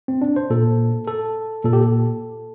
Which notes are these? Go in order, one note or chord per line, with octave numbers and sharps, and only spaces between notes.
C4
D4
C5
A#2 A4
A4
A#2 A4
G4
A4